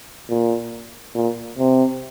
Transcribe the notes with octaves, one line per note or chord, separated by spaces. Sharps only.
A#2
A#2
C3